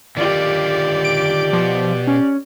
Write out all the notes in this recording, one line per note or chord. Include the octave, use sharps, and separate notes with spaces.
D3 D#3 F4 G4 D5
D7
B2 F3
C#4